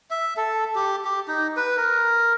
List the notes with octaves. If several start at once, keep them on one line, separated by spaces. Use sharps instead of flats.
E5
A4
G4
G4
D#4
B4
A#4